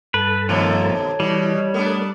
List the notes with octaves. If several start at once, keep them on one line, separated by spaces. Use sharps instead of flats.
G2 A4 B4 A5
B2 D#3 F3 A3 A#3 C#5
B2 E3 G3
A3 B3 D4 A#4